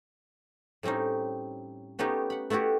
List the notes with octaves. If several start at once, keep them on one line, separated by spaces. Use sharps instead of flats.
A2 G3 C4 C#4 D#4
A3 B3 C#4 D#4 G4
F#5 B5
A3 B3 E4 F#4 G4